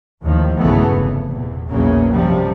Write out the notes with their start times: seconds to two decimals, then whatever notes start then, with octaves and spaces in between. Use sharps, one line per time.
0.23 D#2 A2 D#3 F3
0.60 B1 G2 C#3 E3 A3 B3
0.92 F1
1.28 E2 A#2
1.68 A#1 E2 A#2 C#3 F#3 A#3
2.12 F#2 C3 F3 G3